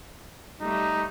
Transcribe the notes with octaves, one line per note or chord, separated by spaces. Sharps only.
G3 A3 D#4